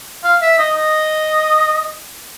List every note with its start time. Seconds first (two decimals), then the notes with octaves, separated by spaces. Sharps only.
0.24 F5
0.42 E5
0.59 D#5
0.76 D#5